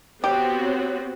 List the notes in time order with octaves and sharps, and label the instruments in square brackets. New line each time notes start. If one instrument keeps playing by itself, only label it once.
[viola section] B3 C4 F#4 [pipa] G4 [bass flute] C#5